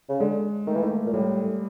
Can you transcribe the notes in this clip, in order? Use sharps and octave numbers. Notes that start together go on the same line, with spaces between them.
C#3
D3 G#3
D#3 A3
E3 A#3
D#3 A3
A#2
A2 G3